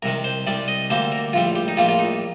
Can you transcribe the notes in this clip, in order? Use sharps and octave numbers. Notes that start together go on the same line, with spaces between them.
C2 C3 D#3 A#4
C5
C2 C3 G3 D5
D#5
D2 D3 G3 A#3 C5
A#4
A#1 A2 G3 F4
G4
D#4
A#1 A2 G3 A#3 F4
F4
D#4